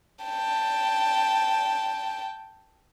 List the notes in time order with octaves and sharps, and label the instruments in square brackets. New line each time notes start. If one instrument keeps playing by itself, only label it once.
[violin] G5 A5